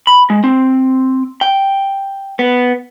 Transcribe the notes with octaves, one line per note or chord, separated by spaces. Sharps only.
B5
G#3
C4
G5
B3